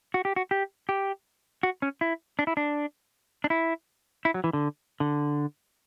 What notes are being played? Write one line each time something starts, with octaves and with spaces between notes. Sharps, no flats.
F#4
G4
F#4
G4
G4
F#4
C#4
E4
D4
E4
D4
D4
E4
E4
F#3
E3
D3
D3